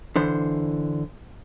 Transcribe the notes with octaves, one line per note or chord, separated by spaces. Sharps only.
D3 E3 C5